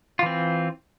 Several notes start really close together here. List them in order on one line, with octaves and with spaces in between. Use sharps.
F4 E3 C4